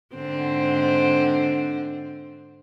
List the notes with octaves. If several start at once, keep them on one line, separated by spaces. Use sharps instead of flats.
G#2 D3 C4